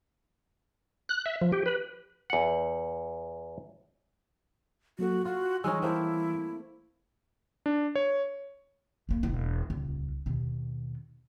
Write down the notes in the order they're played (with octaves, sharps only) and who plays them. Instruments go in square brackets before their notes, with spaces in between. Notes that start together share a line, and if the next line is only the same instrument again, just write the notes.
[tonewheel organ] F#6
E5
F3
G4
B4
[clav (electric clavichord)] E2 F#5
[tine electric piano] F#3 A#3 A4 [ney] F#4
[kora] F4 [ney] F#4 [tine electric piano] C6
[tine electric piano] E3 G3 E6 [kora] G#3 C#4 [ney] D#4
[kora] A3 A#3 C4 [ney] E4
[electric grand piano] D4
C#5
[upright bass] F1 A#3
E1 E4
D#1 C#2
D#2 B2